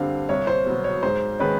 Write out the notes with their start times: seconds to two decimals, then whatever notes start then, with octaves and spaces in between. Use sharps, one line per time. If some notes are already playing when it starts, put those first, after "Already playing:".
Already playing: G2 D3 G3 C4 F5
0.29 C2 C#5
0.47 C5
0.66 B2 F#3 B3
0.84 C#5
1.03 G#2 C5
1.40 D#3 G#3 C#4 B4